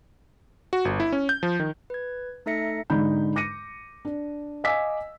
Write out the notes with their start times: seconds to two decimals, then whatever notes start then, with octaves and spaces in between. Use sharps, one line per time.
0.73 F#4
0.85 G1
1.00 E4
1.13 C#4
1.29 G6
1.43 F3
1.60 D#3
1.90 B4 G#6
2.46 A3 D#4 A4 E5 A#6 C#7
2.90 G#2 D3 G#3 D#4 B5 G6
3.36 D6 A#6 C#7 D#7
4.05 D4
4.64 D#5 F5 G#5 D6 E6 B6